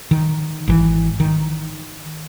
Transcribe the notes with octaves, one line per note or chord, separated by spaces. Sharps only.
D#3
G#1 E3
D#3